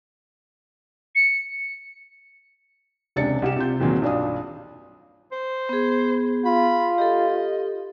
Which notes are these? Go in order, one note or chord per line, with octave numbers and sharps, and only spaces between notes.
C#7
E1 C#2 C3 D4 A6 C#7
C2 G4 E7
C3 F4 G6
E2 A#2 D#3 F#3 C4
B1 G2 D4 F4 F5 D#6
C5
B3 G#4
F4 B5
G4 A4 D#5